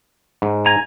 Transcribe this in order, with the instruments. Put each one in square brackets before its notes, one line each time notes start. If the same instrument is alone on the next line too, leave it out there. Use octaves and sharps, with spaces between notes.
[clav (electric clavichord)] G#2
[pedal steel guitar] G#5 A#5